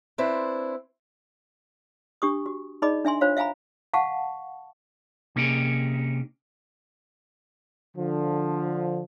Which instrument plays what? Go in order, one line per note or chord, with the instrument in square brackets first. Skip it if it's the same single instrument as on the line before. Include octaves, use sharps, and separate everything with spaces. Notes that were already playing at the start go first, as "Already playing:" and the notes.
[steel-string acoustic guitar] C4 D4 E4 B4 C5
[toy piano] D4 G4 C#6 D#6
F#4
D#4 G#4 D5 D#5 B5 D6
D4 E5 G#5 C6
D4 F4 C5 C#5 F5
E5 F5 G#5 A#5 B5
F5 F#5 A5 C#6
[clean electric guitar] C3 A#3 C#4 D#4 G4 G#4
[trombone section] D3 F3